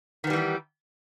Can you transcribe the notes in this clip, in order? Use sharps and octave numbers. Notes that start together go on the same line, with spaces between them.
D#3 E3 G3 B3 G4